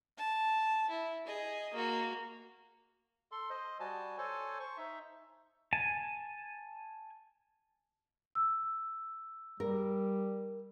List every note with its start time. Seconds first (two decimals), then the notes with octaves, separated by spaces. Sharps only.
0.17 A5
0.90 E4
1.27 G#4 D#5
1.73 A#3 F#4
3.32 A4 C6
3.50 C5 D#5
3.80 G3 F#4 G#5 A5
4.18 A4 C5 C#5 G#5 A5
4.60 C5 C#6
4.77 D#4 E5
5.73 G#5 A5
8.35 E6
9.60 G3 A#4